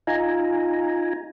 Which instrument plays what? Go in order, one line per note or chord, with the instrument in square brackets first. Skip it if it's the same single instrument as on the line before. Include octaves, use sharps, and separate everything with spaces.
[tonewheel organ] D#4 F4 G#5 A#5